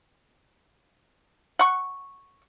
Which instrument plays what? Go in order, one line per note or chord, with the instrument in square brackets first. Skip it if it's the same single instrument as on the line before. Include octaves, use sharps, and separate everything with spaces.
[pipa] F#5 C#6